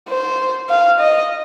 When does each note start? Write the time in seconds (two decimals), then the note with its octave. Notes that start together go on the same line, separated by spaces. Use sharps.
0.09 C5
0.70 F5
1.00 D#5